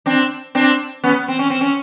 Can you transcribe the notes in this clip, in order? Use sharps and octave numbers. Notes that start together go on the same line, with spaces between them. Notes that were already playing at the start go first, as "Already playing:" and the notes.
C4 D4
C4 D4
B3 C#4
C4
C#4
C4
C#4